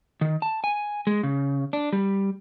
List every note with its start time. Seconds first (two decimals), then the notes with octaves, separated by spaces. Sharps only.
0.21 D#3
0.42 A5
0.64 G#5
1.07 G#3
1.23 C#3
1.73 D4
1.93 G3